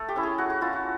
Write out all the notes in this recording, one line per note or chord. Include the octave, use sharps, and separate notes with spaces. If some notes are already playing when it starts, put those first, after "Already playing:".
Already playing: A3 A4
G4
C#4 E4
G#4
A3 F#4
F#4
C#4 E4 F4
F#4